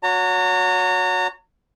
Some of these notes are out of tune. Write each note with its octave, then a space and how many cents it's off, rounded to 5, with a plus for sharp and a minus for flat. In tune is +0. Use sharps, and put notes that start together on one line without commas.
F#4 -25 C#5 +20 A#5 -35